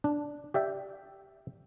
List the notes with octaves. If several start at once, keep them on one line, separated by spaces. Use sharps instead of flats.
D4
G4 D5 E5 G5